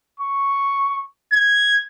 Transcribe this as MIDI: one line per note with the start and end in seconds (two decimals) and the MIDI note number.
0.20 1.02 85
1.33 1.82 92